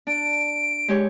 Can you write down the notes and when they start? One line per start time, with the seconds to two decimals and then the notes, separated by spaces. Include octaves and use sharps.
0.07 D4 D7
0.88 G#3 G4 C#5